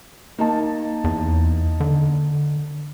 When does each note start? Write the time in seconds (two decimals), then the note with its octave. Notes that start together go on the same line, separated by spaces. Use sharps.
0.38 A#3 D#4 A5
1.04 E2
1.80 D3